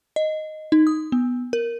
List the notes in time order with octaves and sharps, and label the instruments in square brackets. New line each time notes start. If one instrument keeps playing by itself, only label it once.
[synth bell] D#5
D#4
D#6
B3
A#4